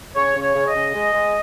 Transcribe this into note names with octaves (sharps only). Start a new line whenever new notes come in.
C#3 C#5
C#3
C#5
C#3
D#5
C#3
G#3
G#3